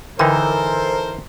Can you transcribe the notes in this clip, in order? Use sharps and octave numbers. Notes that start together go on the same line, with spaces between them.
D3 E3 D#4 A4 A#4 C5 G5